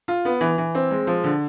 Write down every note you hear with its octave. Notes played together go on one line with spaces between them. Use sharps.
F4
B3
E3
E3
C4
G#3
F3
D3